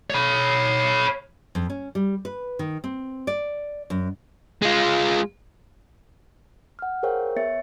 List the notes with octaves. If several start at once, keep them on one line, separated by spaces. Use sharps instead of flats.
C#5 B5
F2
C#4
G3
B4
D#3
C4
D5
F#2
G#3 F4
F#5 F6
G#4 A#4 C5 C#5 F5 G5
B3 C#5 E5 A6 C#7